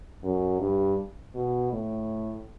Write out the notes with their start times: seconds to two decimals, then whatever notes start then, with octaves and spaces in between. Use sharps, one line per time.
0.23 F#2
0.60 G2
1.35 B2
1.73 A2